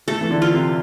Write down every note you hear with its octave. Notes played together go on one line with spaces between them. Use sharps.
A3 A4
E3
D3
F4
C3